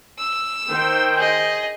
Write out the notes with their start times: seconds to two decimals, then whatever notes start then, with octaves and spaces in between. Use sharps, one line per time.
0.19 E6
0.68 D#3 C5 G5
1.17 G#4 D#5